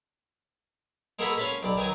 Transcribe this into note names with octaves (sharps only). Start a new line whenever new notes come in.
G#3 A#3 F#4 G#4 A4 B4
C#4 F4 F5 B5 C6
B1 D5
D#3 F#3 G#5